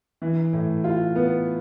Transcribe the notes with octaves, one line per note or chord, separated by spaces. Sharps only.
E3
A2
F4
B3